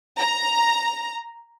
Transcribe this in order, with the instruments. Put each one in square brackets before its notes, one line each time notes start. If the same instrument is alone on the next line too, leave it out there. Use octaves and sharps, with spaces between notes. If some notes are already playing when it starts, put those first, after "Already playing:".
[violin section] A#5